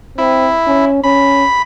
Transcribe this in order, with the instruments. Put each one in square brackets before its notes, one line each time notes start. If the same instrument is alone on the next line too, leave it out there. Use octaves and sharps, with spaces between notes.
[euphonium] C4 [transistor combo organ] E4
[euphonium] C#4
[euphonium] C#4 [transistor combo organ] B5